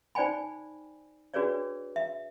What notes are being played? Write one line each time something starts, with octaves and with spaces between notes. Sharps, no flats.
D#4 C5 D5 G5 G#5 B5
D4 F#4 G#4 B4 C#5 D5
E5